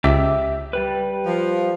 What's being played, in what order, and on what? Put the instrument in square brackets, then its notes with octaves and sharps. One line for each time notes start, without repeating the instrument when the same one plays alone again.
[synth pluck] C#2 [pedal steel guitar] G4 E5 D6
[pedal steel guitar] G3 G4 B4
[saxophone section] F3